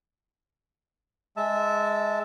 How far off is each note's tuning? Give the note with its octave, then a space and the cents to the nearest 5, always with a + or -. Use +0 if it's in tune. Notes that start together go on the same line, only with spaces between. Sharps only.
G#3 +0 E5 -20 A5 +0